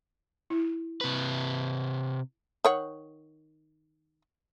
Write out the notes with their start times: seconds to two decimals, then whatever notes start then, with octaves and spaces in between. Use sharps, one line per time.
0.50 E4
1.01 C3 B4
2.65 D#3 C#5 F#5